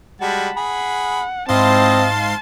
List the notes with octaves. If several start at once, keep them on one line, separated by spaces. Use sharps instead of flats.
G3 G#3 F#4 A5 B5
G#4 F#5 B5
G#2 C4 E4 D#5 F5 A5 C6